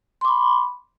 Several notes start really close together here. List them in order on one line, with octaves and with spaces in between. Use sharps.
C6 D6 B5